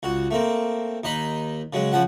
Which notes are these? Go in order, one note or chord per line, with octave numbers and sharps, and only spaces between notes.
C#2 F#4
A3 A#3 C4
D#2 D#4 D#5 B5
C#3 F#3 G#3
C#3 F3 F#4 F#5